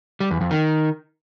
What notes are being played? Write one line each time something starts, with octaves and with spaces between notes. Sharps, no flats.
G3
E2
F2
D#3